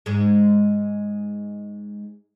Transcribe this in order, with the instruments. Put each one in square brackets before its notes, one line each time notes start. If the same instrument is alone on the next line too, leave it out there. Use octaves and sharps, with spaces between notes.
[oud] G#2 G#3